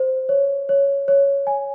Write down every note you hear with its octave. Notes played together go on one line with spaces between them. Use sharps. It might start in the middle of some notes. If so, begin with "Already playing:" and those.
Already playing: C5
C#5
C#5
C#5
G#5